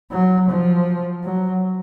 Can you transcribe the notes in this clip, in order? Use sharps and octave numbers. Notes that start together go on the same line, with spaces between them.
F#3
F3
F#3